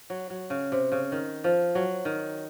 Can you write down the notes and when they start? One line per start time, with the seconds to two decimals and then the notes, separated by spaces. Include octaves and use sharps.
0.10 F#3
0.30 F#3
0.50 C#3
0.72 C3
0.92 C#3
1.12 D#3
1.44 F3
1.75 F#3
2.05 D#3